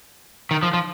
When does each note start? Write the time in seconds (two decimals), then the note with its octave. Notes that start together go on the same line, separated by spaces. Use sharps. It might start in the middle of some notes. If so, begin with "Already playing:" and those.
0.51 D#3
0.63 F3
0.73 F3